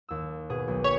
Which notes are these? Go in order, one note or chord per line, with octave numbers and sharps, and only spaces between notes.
D#2 E6
B2 G#4
B1
C#5 B6